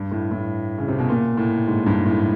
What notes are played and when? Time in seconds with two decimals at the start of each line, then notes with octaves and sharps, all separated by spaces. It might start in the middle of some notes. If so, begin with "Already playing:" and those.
Already playing: G2
0.11 A2
0.31 A2
0.78 C#3
0.88 C3
0.99 B2
1.09 A#2
1.37 A2
1.67 G#2
1.86 G2
2.06 A2